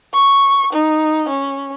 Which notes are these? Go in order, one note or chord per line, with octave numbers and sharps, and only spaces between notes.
C#6
D#4
C#4